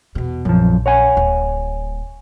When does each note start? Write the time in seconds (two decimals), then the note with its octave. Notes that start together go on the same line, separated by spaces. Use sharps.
0.15 E2 B2
0.45 A#1 F#2 F3
0.86 C#5 F#5 G#5
1.17 D1